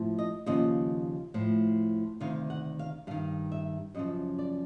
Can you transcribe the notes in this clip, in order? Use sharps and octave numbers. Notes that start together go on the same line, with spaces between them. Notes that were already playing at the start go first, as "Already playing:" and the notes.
Already playing: A2 F3
D#5
D#2 C#3 F3 D#5
A2 F3
D2 C3 D#3 F5
F#5
F5
G2 D#3 F5
E5
F#2 C#3 F3 D#5
D5